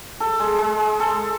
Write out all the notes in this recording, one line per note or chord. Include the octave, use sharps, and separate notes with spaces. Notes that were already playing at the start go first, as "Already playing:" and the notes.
A4
G#3
G#3
A4